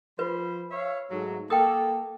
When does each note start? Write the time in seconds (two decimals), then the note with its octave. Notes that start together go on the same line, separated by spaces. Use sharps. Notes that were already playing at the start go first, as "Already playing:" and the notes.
0.19 F3 B4 C5 B5
0.71 C#5 E5 F5
1.10 G#2 F#3 A3
1.50 A#3 A4 G5 D#6